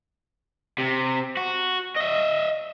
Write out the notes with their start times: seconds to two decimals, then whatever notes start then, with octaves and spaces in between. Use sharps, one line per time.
0.79 C3
1.37 F#4
1.96 D#5 E5